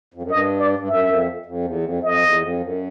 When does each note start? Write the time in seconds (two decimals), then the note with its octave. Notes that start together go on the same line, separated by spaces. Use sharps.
0.14 F2
0.23 F#2
0.31 G2 D#5
0.59 D5
0.79 G2
0.89 F#2 E5
1.08 F2
1.46 F2
1.65 E2
1.84 F2
2.03 F2 D#5
2.23 E2
2.42 F2
2.61 F#2